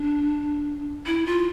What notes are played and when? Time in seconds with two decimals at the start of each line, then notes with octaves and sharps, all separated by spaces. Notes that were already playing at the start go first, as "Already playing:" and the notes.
Already playing: D4
1.06 E4
1.26 F4